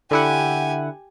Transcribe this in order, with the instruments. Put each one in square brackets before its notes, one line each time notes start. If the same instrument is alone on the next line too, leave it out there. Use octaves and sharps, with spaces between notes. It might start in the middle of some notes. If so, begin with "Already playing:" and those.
[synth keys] D3 E4 F#5 [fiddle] G4 G#5